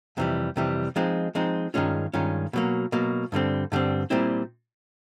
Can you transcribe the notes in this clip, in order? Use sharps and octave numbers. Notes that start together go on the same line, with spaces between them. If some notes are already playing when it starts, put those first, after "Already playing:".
F2 C3 E3 G3
F2 C3 E3 G3
F3 G#3 C4 D#4
F3 G#3 C4 D#4
G2 D#3 G#3 C#4 F4
G2 D#3 G#3 C#4 F4
B2 F#3 A#3
B2 F#3 A#3
G2 D3 G3 C4
G2 D3 G3 C4
A#2 G3 C4 E4